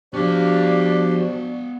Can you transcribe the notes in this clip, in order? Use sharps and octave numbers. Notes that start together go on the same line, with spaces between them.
F3 B3 D4 F#4 G4 D5 F5